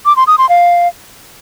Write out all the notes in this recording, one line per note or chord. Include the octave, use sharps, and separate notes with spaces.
D6
C6
D#6
C6
F5